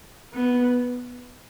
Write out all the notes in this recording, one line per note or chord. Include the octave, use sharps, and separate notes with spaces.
B3